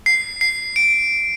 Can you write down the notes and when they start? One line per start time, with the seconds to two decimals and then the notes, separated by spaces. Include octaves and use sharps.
0.06 C7
0.41 C7
0.76 D7